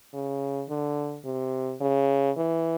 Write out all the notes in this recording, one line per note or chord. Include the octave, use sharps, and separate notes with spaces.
C#3
D3
C3
C#3
E3